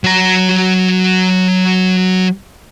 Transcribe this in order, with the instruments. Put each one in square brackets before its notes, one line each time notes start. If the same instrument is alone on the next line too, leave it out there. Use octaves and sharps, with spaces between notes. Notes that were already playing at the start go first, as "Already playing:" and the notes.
[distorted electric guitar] F#3 A#5